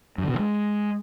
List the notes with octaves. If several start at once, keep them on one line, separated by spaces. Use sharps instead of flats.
F#2
D3
B2
D3
G#3